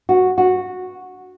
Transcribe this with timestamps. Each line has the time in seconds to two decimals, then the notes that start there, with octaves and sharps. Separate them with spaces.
0.09 F#4
0.38 F#4